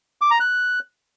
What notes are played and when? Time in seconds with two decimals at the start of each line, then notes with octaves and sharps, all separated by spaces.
0.21 D6
0.31 A#5
0.40 F#6